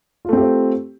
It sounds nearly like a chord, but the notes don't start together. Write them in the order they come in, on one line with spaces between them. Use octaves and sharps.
F4 A3 C4 G4 C5